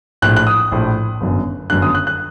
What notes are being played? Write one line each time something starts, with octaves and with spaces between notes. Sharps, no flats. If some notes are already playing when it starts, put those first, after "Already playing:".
A#1 A2 F#6
F#6
D#6
A#1 A2
G1 F#2 D3
G1 F#2 D3 F#6
D#6
F#6
F#6